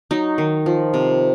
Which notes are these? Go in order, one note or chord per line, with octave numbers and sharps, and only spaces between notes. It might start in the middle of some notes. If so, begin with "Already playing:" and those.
F#3 D#4
D#3
F3
C3